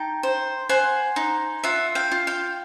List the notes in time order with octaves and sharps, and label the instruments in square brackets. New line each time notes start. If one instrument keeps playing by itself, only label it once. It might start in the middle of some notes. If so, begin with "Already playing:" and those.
Already playing: [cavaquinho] D#4 G5 A5
C5
C5 F#5 G#5
D#4
F4 E5 F#5
F5 G5
F4
F5 G5